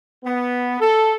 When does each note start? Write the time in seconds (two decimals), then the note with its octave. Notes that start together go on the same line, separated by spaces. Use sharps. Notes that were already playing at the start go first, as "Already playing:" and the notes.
0.24 B3
0.80 A4